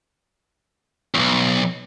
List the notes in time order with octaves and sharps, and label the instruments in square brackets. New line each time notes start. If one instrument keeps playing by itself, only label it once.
[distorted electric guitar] B1 E2